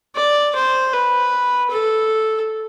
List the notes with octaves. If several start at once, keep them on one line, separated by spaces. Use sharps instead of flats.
D5
C5
B4
A4